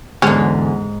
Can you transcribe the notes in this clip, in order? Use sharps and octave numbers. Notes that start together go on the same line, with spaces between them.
E2 G#2 D3 C#4